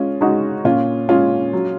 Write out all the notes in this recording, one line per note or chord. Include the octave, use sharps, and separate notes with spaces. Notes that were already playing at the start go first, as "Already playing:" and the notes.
Already playing: G#3 C#4 F4
G#3 D#4 F#4
A#2 C#4 F4
G#3 C#4 F4
F#3